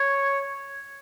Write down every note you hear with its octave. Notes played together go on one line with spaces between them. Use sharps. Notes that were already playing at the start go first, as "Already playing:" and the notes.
Already playing: C#5